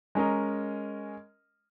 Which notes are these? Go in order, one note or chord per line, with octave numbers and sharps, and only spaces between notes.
G#3 C#4 A#4 D#5